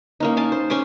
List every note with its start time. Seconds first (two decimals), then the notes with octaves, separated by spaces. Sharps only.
0.20 A#3 C#4 D#4
0.37 F5 G#5 A5
0.52 C5
0.70 C#4 G#5 C6 D6